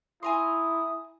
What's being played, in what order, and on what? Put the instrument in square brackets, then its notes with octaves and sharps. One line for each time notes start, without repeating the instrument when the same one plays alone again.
[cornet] E4 [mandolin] G#5 A#5 C6 [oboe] D#6